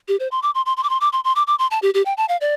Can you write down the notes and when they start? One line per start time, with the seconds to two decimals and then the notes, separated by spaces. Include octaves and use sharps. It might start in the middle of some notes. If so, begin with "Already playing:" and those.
0.08 G4
0.20 C5
0.32 C6
0.43 D6
0.55 C6
0.66 C6
0.77 C6
0.83 D6
0.90 C6
1.01 D6
1.13 C6
1.24 C6
1.36 D6
1.47 D6
1.59 C6
1.71 A5
1.82 G4
1.94 G4
2.06 G5
2.17 A5
2.29 F5
2.41 D5